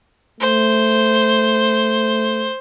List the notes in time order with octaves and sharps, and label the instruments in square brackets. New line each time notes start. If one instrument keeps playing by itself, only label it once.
[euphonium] A3 [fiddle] C5